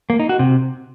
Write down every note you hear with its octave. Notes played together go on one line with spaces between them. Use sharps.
A#3
D#4
F#4
C3